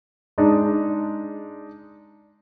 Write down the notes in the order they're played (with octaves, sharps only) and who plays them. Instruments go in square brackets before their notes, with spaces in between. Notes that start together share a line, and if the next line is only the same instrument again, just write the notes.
[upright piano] G#3 D4 D#4